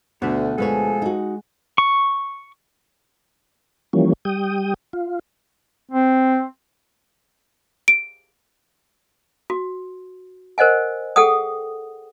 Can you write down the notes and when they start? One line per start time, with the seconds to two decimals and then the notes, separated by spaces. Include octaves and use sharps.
0.22 D2 B2 D3 A3 F#5
0.58 D2 F3 G#3 G#4 A4 B4 C#5
1.02 D#4 F#4
1.78 C#6
3.93 E3 F3 G3 A#3 C#4
4.25 G3 G5 D#6
4.93 F4
5.91 C4
7.88 D7
9.50 F#4
10.58 A#4 C5 D#5 F#5 G#5
11.16 G#4 A4 F#5 G5 D#6